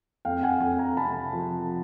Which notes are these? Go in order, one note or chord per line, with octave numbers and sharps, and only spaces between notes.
F2 F5 G5
F#5 G#5
F2 F#5 G#5
G#5 A#5
C3 A5 B5
F3